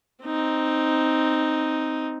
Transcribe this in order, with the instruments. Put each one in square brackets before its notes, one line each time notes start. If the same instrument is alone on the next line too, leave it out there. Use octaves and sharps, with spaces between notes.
[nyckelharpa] C4 D#4